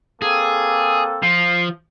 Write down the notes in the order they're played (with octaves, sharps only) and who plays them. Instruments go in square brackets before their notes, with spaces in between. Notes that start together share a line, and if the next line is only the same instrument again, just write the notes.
[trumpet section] A#3 C4 A4 [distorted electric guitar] G#4
[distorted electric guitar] F3 [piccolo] C7